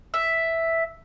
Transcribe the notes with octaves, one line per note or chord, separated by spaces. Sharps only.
E5